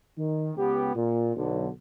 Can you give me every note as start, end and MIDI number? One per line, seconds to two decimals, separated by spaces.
0.17 0.52 51
0.56 0.91 37
0.56 0.91 59
0.56 0.91 67
0.94 1.31 46
1.36 1.68 35
1.36 1.68 50